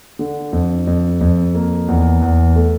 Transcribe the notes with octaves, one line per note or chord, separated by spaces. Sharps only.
D3
F2
F2
F2
A#3
E2
E2
A3